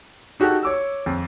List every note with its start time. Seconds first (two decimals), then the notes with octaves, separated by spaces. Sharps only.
0.40 D#4 F#4 G4 A4
0.63 C#5 D6 E6
1.06 F2